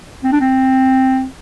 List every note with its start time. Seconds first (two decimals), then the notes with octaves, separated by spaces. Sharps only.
0.24 C4
0.32 D4
0.41 C4